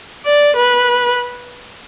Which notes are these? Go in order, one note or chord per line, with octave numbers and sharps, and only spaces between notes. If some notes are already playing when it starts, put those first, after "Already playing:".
D5
B4